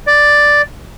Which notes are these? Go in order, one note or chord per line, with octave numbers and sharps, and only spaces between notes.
D5